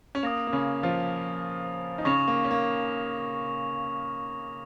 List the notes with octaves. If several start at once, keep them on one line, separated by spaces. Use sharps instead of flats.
C#4
A#3 D#6 A#6 F7
A#3
C#3 C#4
F3 F4
D#4
C#3 C#4 C#6 A#6 F7
A#3
C#4
A#3